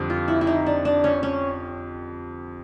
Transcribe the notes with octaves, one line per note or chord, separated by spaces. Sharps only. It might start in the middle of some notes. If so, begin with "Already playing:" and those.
Already playing: F2 D3 G3 C4
F4
E4
E4
D#4
D4
D4
C#4
C#4